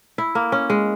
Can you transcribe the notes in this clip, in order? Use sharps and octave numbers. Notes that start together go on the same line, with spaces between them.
E4
A#3
C#4
G#3